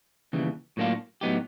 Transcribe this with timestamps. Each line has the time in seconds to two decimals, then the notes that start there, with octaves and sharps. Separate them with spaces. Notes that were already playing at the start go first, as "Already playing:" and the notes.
0.33 D#2 C#3 E3 G3
0.77 A2 F#3 A#3 D4 F4
1.21 A2 F#3 B3 D#4 G4